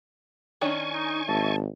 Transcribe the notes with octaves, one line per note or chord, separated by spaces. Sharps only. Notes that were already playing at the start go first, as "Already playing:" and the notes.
D#3 C#4 D4 G#5 C#6
D#4
G#1 D#5 E5 A5